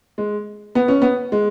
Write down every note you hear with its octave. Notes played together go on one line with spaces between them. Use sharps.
G#3
B3
C#4
B3
G#3